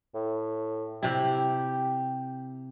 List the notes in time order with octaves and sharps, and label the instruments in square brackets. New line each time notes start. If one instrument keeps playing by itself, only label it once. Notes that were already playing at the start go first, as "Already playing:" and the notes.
[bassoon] A2
[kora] C3 E4 [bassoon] G4